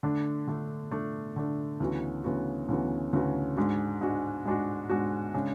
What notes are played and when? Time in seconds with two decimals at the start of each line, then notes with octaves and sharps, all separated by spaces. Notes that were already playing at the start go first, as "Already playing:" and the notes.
0.03 D3 A3 D4
0.48 D3 A3 D4
0.91 D3 A3 D4
1.36 D3 A3 D4
1.80 D2 C#3 E3 B3 F#4
2.24 D2 C#3 E3 B3 F#4
2.68 D2 C#3 E3 B3 F#4
3.13 D2 C#3 E3 B3 F#4
3.57 G#2 G#3 D4 F#4
4.01 G#2 G#3 D4 F#4
4.45 G#2 G#3 D4 F#4
4.90 G#2 G#3 D4 F#4
5.34 C#3 G#3 D4